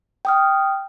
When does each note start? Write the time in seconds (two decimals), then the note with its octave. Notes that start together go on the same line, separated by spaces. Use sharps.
0.25 G5 D#6 F6